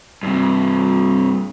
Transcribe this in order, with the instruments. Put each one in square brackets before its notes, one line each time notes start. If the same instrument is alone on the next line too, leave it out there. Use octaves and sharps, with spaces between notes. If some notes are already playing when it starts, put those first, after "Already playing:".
[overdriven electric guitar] G2 C3